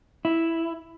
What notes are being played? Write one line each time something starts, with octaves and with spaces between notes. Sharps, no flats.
E4